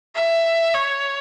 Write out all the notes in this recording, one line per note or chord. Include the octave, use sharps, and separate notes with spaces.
E5
C#5